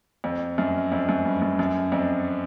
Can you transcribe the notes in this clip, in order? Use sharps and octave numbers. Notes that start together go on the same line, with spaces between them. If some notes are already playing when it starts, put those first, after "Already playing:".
F2
F#2
F2
F#2
G2
F#2
F#2
F2